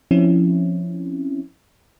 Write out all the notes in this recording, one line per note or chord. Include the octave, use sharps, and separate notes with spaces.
F3 C4 C#4 E4